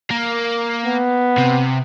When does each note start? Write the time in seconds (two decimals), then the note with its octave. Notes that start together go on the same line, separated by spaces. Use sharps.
0.11 A#3
0.85 B3
1.38 C3